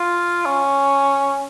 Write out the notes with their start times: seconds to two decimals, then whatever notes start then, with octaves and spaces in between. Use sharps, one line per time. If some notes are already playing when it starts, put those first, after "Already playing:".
Already playing: F4
0.46 C#4